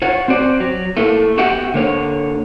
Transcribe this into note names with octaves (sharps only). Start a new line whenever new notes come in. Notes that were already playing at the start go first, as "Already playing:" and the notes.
F4 C#5 F#5
C4 F#4 D5
F#3
A3 A#3 E4
B3 F#4 G4 E5 F#5 G5
D3 A#3 C#5